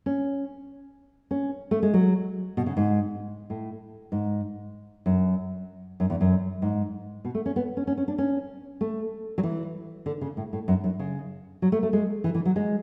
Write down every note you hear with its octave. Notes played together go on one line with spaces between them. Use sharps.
C#4
C#4
A3
G#3
F#3
B2
C#3
G#2
A2
G#2
F#2
F#2
E2
F#2
G#2
B2
A3
C#4
B3
C#4
C#4
C#4
D4
C#4
A3
F#3
E3
D3
C#3
A2
A2
F#2
F#2
C#3
F#3
A3
A3
G#3
E3
E3
F#3
G#3